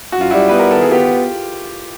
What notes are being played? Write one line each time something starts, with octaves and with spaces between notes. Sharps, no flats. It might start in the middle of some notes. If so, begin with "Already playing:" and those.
F#2 F#4
F4
G3 E4 F#4
B3 B4
A#4
D#3 A4
G#4
B3 F4 G4